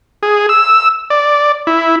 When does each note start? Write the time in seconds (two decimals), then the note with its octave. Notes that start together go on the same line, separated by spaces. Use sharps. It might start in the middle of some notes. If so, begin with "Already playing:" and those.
0.23 G#4
0.49 E6
1.10 D5
1.67 E4